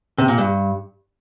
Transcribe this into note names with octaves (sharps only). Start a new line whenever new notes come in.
C3
A#2
G2